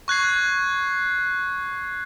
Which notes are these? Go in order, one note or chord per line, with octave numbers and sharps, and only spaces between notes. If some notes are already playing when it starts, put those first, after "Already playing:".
C#6 F#6 G#6 C7